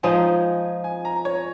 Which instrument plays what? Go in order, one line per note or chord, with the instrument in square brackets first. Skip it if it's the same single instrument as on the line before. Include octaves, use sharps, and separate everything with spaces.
[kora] F3 G#3 D#4 [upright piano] G#5
[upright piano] G#5
A#5
C#5